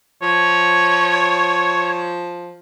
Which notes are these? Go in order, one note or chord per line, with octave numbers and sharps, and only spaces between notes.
F3 C#5